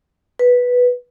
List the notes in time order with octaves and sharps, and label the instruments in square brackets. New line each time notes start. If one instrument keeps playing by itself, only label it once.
[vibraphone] B4